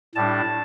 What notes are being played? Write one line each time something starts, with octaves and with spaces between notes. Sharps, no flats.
A2 G3 D4 A5